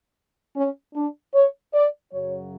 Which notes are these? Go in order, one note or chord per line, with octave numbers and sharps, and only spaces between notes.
C#4
D4
C#5
D5
F#2 C#3 F#3 C#5